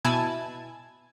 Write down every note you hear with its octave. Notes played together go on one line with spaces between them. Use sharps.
B2 E4 G#5 A5 G#6